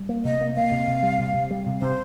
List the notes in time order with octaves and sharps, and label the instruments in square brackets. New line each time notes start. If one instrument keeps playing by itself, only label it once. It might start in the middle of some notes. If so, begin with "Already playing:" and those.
Already playing: [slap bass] G3
A#3
[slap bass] C3 [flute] D#5
[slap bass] A#3
[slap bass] A#3 [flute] F5
[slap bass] C3
C3
G3
C3
C3
G3
C3
[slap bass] C3 [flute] C5